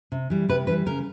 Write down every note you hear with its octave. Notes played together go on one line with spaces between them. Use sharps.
C3
E3 G3
C3 B4
E3 G3 B4
C#3 A#4